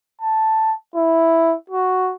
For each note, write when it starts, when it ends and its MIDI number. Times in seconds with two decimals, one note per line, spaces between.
0.22 0.73 81
0.95 1.55 64
1.70 2.13 66